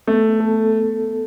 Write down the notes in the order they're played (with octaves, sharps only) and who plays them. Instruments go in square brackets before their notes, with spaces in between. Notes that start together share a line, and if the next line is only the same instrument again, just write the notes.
[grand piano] A3 [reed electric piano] B3
[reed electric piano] A4